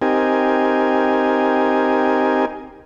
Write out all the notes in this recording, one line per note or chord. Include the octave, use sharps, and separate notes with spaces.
C4 D#4 G4 A#4 G#5